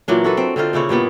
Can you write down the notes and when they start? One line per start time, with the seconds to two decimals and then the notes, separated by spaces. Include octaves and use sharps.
0.08 A#2 E3 F#3 D4
0.24 F#4 A4 B4
0.37 C4
0.56 D3 C4 D#4 F4
0.73 A#2 C#3 E4 C#5
0.89 G2 A#2 G3 B3